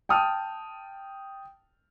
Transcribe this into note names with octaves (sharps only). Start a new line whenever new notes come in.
G5 A5 D#6 F6